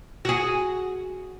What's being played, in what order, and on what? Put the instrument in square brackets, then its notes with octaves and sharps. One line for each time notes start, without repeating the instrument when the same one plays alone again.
[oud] F#4 G#4